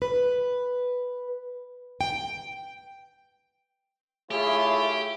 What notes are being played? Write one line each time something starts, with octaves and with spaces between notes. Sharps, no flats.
B4
G5
A3 E4 F4 G4 G#4 C#5 E5